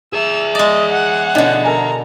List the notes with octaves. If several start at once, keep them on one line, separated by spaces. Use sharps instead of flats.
G#4 E5 E6
G#3 D5 D#5
F#5
B2 D3 C#4 D4 D#5
A4 A#4 G#5 A#5